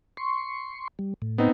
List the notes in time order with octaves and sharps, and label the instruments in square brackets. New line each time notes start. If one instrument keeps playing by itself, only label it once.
[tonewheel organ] C6 C#6
G3
A2
[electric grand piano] B3 C4 D#4